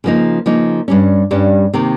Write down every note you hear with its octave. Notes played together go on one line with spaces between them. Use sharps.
C#3 F3 A#3 D#4
C#3 F3 A#3 D#4
G2 G3 C#4
G2 G3 C#4
C3 D#3 A#3